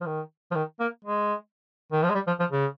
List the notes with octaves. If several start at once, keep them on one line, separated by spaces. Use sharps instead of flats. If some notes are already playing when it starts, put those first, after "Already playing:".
F3
D#3
F3
D#3
A#3
G#3
D#3
F3
G#3
G3
F3
F3
C#3